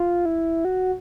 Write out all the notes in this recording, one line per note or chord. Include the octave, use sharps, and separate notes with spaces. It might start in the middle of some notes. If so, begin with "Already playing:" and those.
Already playing: F4
E4
F#4